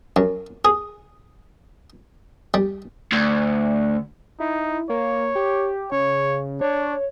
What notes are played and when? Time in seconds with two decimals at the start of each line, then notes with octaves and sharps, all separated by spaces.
0.16 F#2
0.65 G#4
2.54 G3
3.12 D2
4.40 D#4 E4
4.89 A#3 C#5
5.35 G4
5.92 C#3 C#5
6.61 D4 C#5